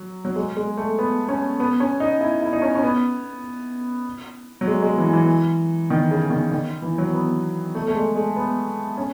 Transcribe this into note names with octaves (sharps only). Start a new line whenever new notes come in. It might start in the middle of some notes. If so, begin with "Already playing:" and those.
Already playing: F#3
F#3
G#3
G#3
A3
B3
C#4
B3
C#4
D#4
E4
E4
D#4
C#4
C#4
B3
F#3
G#3
G#3
E3
E3
D#3
C#3
D#3
D#3
E3
F#3
B3
A3
A3
G#3
G#3
B3
C#4